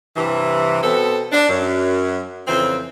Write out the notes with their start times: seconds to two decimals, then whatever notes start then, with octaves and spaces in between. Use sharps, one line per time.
0.17 G2 C3 E3
0.83 B2 B3 C4 A4
1.32 D4
1.49 F#2
2.48 F2 C#3 E3 C4